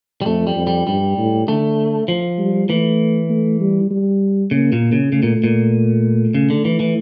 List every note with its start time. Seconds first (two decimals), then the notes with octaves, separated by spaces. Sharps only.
0.22 G3
0.26 F2 A3
0.47 G3
0.56 F2
0.67 G3
0.87 G2 G3
1.18 A2
1.48 D3 A3
2.08 F3
2.39 G3
2.69 E3 A3
3.30 A3
3.60 G3
3.91 G3
4.51 C#3 A#3
4.72 A#2
4.92 C#3
5.12 C#3 A3
5.23 A#2
5.44 A#2
6.35 C#3
6.50 D3
6.65 E3
6.80 E3